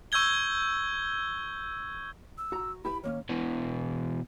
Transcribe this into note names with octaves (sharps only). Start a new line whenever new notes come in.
C#6 E6 G6 G#6 G7
E6
F#4 A#5
E4 G4 B4 B5
D#3 A#3 C#4 C#5
B2 E3